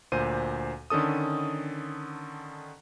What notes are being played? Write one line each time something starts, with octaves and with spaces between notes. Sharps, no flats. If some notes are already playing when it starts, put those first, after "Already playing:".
D2 A#2 C5 D#7
D3 D#3 C#4 A4 D#6